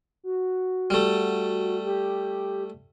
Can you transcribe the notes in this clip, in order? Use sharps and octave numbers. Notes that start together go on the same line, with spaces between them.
F#4
G3 A3
G4